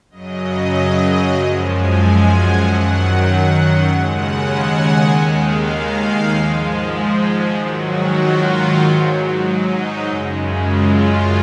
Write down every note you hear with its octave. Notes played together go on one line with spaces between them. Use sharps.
F#2 C#3 F#3 D#5
F#2 F3 G#3 F#5
G#5
G#5
F#5
F#2 D#3 F#3
D#2 C#3 G#3 F#5
F#5
G#5
G#5
D#2 D#3 G#3 F#5
F5
F5
G#2 F3 G#3
G#2 D#3 F#3 F#4
F4
G#2 F#3
D#4
F#2 C#3 G#3
F4